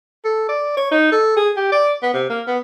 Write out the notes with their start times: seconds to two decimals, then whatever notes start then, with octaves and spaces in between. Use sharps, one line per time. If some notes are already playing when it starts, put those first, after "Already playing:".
0.25 A4
0.48 D5
0.77 C#5
0.91 D#4
1.12 A4
1.36 G#4
1.56 G4
1.72 D5
2.02 B3
2.14 C3
2.30 A#3
2.47 B3